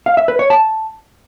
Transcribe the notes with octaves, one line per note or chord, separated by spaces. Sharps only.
F5
E5
B4
C#5
A5